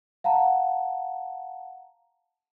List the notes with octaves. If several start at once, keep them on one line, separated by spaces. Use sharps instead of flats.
F5 F#5 A5 A#5